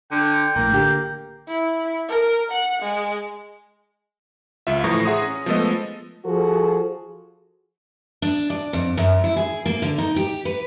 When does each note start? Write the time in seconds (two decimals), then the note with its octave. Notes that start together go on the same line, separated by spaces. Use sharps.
0.12 D3 G5
0.56 A#1 A2 A#3
0.72 D3 G4
1.48 E4
2.09 A#4
2.51 F#5
2.82 G#3
4.67 C#2 F4 E5
4.84 A2 E3 F3 A#5 C#6 A#6
5.05 G#4 E5 F#5 A#5 C6 D#6
5.22 C#4
5.46 F3 G#3 A3 B3 A4 D#5
6.25 F3 F#4 G#4 A4
8.22 D4
8.50 D5
8.73 F2
8.98 F#2
9.24 E4
9.36 G#4
9.66 A#3
9.82 D3
9.98 D#4
10.16 G4
10.45 B4